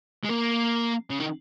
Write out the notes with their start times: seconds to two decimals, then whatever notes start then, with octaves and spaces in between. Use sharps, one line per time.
0.23 G#3
0.29 A#3
1.10 C#3
1.19 D#3